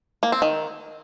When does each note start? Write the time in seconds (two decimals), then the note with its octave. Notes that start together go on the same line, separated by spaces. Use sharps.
0.23 A#3
0.32 C4
0.42 D#3